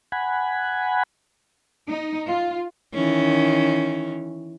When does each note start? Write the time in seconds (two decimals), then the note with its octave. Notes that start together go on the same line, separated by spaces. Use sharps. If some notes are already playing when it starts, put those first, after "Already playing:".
0.12 F#5 G#5 B5
1.88 D#4
2.27 F4
2.94 D#3 E3 C#4